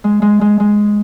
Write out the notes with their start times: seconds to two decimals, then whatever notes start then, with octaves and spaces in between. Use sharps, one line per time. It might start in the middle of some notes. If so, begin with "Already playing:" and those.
0.04 G#3
0.22 G#3
0.41 G#3
0.60 G#3